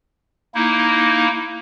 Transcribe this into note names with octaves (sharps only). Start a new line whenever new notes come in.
A#3 D#4 E4